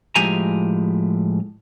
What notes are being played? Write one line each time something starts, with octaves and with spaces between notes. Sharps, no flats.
A2 F3 G#3 G4 G#5 A#5